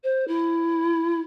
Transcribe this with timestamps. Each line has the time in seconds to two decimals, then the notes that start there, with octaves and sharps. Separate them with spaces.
0.03 C5
0.27 E4